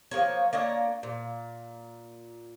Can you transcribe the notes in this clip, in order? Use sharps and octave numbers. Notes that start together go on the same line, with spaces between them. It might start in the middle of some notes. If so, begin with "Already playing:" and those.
F3 F#3 A#3 C#5
A#3 D4 C#5 D#5
A#2